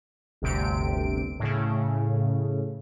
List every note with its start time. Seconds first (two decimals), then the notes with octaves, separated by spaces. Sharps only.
0.42 G1 D2 C3 D7
1.39 A2 C#3